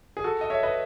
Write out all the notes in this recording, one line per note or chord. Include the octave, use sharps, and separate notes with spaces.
G#4
F#4 A4
D#5
C#5 E5
B4 D#5